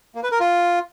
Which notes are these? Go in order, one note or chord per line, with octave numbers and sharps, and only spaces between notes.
A#3
B4
A#4
F4